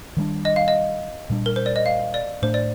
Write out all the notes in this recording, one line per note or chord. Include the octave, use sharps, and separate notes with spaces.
D#3 G3 A#3 D4
D#5
F5
D#5
A#2 G3 D4
A#4
C5
D5
D#5
F5
D5
A2 A3 D4 C5
D5